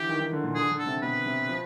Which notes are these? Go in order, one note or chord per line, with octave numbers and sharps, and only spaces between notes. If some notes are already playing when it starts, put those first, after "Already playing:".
Already playing: D3 E3 G4
D#3
D#3
D3
A#2
D3 G#4
D3
A4
C3
B2 B4
C3
F3